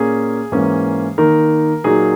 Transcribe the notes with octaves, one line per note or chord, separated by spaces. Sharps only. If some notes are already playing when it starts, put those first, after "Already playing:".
Already playing: A#2 A#3 C#4 G#4
G#2 E3 A#3 C#4
D#3 A#3 D#4 A#4
A#2 F#3 A#3 D#4 G#4